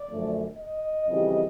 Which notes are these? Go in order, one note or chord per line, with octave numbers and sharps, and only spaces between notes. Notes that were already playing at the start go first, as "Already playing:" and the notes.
Already playing: D5
F#2 D3 F3 A3
D#5
F2 C#3 E3 G3